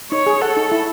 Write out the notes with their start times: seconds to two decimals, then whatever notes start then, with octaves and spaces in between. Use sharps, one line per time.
0.12 D#4 C#5
0.26 G#4
0.42 A4 F#5
0.57 D#4
0.72 E4